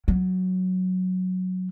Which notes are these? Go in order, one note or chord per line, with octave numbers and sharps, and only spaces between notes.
F#3